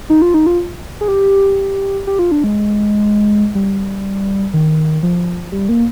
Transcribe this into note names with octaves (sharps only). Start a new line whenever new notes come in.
D#4
F4
D#4
F4
G#4
G4
G4
F4
D4
G#3
G3
D#3
F3
G3
A#3